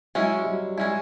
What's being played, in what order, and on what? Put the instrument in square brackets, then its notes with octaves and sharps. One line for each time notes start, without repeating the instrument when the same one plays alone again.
[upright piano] F#3 [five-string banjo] G#3 C#4 E4
[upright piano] G3
F#3
[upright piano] G3 [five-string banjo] G#3 C#4 E4